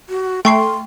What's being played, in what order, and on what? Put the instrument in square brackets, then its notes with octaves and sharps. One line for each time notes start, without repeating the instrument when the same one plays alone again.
[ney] F#4
[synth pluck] A3 [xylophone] G5 C#6 C7 [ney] C6